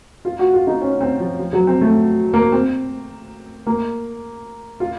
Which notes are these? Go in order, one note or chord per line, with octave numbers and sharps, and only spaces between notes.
F4
F#4
F4
D#4
C#4
C4
F3
F3
F#3
C4
A3
A#3
C4
A#3
F4